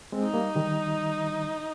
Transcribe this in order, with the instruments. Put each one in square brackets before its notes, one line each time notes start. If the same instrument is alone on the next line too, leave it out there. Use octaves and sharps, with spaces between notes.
[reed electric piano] G#3 C4
[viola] D#4
[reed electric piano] G3 A#3
D#3 G3